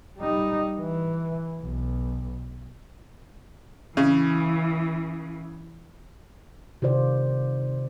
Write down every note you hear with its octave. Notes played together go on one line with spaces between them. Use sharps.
G3 D#4
E3
B1
C#3 E3
C3 D#3 F4 C5 D5